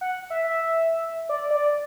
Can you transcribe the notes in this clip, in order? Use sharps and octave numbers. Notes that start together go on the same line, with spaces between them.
F#5
E5
E5
D5
D5